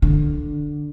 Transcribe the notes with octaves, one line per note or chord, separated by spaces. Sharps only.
D3